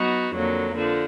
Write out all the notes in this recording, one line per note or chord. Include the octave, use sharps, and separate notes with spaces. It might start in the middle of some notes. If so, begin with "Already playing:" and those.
Already playing: F#3 B3 D#4 F#4
F2 D3 F#3 A#3
D3 F3